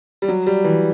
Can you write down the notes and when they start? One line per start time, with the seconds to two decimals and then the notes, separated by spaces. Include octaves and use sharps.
0.22 G3
0.28 F#3
0.47 G3
0.64 E3